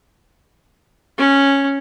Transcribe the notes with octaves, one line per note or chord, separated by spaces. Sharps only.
C#4